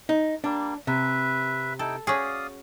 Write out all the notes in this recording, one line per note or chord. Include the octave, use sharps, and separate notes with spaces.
D#4
G3 A#3 D4
C3 B4 E5
D#4 E4 A4 G5
C#4 F#4 G#4 D5 F5 D#6